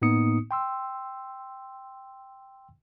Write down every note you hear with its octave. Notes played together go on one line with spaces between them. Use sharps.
A2 A#3 B3 D#4 D#6 C#7
G5 C6 E6